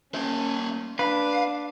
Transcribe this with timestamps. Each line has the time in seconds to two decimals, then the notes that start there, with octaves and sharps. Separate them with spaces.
0.14 A#3 C#4 E5
0.99 D4 B4 F5